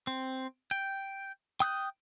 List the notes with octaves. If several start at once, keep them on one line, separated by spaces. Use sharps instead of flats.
C4
G5
G5 D#6 F#6 G6